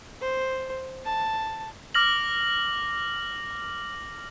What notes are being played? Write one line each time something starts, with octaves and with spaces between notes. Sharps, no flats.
C5
A5
D6 F6 A#6 F#7